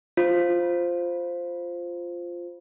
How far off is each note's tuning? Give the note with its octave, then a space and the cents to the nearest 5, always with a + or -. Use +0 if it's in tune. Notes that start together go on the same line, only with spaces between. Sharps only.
F4 +0 C5 +0